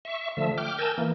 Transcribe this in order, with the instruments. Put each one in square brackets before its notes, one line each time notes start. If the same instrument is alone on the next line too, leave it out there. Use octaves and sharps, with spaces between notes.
[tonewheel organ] E5 C#6
D3 F3 A3 E5
G5 D6 F6
A#4 G#5 A5 E6 G6
E3 A#3